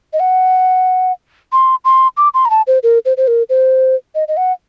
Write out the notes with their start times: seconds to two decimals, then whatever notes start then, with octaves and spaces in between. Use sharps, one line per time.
0.13 D#5
0.20 F#5
1.52 C6
1.85 C6
2.17 D6
2.34 C6
2.45 A#5
2.50 A5
2.67 C5
2.83 A#4
3.05 C5
3.17 C5
3.28 A#4
3.49 C5
4.15 D#5
4.28 D#5
4.37 F#5